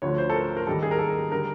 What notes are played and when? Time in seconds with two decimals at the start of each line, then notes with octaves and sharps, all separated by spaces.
0.02 D2 D3 F3 A3 C#5
0.18 C5
0.30 A4
0.34 A#4
0.57 A#4
0.67 D#2 D#3 G3 A4
0.83 G#4
0.91 A#4
0.99 A4
1.32 D3 G3 A#4